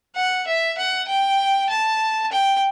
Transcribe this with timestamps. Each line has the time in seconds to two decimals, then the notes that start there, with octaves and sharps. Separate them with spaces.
0.15 F#5
0.47 E5
0.78 F#5
1.08 G5
1.70 A5
2.32 G5